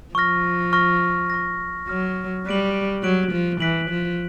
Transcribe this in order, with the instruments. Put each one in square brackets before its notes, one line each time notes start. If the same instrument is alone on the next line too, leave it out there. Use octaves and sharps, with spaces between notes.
[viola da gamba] F3 [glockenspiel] C#6 F6 A#6
[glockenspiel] C#6 F6 A#6
C#6 F6 A#6
[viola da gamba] F#3 [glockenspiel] C#6 F6 A#6
[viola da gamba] G3 [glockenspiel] F#6 B6 D7 F#7
[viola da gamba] F#3 [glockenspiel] F#6 B6 D7 F#7
[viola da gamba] F3
[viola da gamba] E3 [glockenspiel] F#6 B6 D7 F#7
[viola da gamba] F3